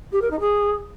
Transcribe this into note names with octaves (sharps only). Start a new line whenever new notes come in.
G4
A#4
D#4
G#4